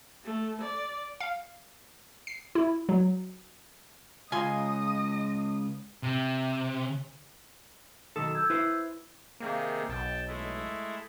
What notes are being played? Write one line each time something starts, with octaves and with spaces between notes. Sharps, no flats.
A3
D5
F5
C7
E4
F#3
C#2 F4 D#5 G#5 C6 D#6
C3
B1 D#3 A4 D#6 E6 E7
E6 G6 G#6
E4 B4 C5
C3 D#3 A#3 G#4
B1 G5 A5
G#3 A3 E4